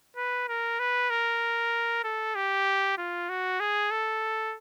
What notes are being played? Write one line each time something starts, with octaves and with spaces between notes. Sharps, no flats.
B4
A#4
B4
A#4
A4
G4
F4
F#4
G#4
A4